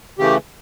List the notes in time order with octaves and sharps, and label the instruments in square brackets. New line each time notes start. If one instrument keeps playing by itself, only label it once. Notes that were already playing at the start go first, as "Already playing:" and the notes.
[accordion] C#3 E3 A3 G4